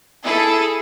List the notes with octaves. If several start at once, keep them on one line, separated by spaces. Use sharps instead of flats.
E4 G#4 A4